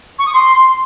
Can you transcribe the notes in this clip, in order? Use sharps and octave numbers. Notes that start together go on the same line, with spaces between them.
C#6
D#6
C6